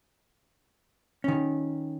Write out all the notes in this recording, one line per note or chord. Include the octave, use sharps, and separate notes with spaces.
D#3 C#4